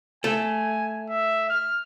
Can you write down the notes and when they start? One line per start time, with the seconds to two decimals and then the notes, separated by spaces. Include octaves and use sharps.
0.24 A3 G#5
1.10 E5
1.50 F6